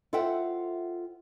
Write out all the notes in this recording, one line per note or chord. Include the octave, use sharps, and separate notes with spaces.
F4 A4 C5 E5 F#5 G5